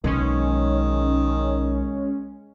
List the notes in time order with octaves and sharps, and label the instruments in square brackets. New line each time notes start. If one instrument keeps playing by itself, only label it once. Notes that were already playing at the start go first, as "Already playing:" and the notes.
[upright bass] B1 [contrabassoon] D#3 [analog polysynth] G#3 C#4